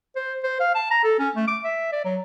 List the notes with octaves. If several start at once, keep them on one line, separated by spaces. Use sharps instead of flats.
C5
C5
F5
A5
A#5
A4
C#4
A3
D6
E5
D5
F#3